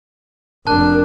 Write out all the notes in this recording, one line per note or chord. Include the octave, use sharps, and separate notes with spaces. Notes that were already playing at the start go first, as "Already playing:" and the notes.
F1 D4 A#4 A5 F#6